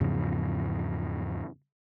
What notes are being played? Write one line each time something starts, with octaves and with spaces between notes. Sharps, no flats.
E2 G#2 C#3 F3